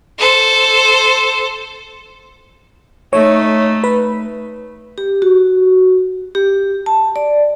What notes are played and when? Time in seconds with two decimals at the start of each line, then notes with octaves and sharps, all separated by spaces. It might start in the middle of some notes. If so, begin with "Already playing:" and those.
0.18 A4 C5
3.13 A3 D#4 C#5
3.84 B4
4.98 G4
5.22 F#4
6.35 G4
6.86 A5
7.16 D5